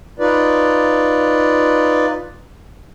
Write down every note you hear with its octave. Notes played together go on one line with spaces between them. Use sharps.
D#4 F4 B4 D5